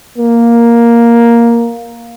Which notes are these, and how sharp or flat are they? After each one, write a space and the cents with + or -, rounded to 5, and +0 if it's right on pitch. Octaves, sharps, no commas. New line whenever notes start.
A#3 +5